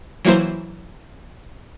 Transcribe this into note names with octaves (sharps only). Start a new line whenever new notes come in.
E3 F#3 A#3 E4 C5